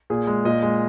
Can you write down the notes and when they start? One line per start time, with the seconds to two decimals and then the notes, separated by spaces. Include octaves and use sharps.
0.10 A#2 G#4
0.27 G#3
0.45 A#2 D#5
0.63 G#3